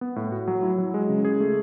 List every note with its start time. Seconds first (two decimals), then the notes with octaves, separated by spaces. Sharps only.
0.01 B3
0.16 A2
0.32 F#4
0.47 F#3
0.63 E4
0.78 F#3
0.94 G#3
1.09 C#3
1.25 G#4
1.40 A3